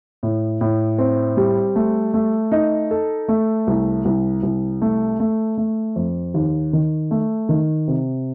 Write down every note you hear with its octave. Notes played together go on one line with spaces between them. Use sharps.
A2
A2
C4
G3
A3
A3
D#4
A4
A3
C2
C2
C2
A3
A3
A3
F2
D#2
D#3
A3
D#3
C3